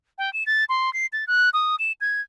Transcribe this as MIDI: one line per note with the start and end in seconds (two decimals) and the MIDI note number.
0.18 0.32 79
0.33 0.44 100
0.46 0.64 93
0.69 0.93 84
0.93 1.06 96
1.13 1.25 93
1.27 1.49 90
1.53 1.76 87
1.79 1.92 100
2.01 2.21 92